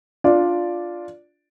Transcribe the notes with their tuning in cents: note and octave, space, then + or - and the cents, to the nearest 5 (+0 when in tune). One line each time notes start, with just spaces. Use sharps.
D4 +0 F4 +0 D5 -5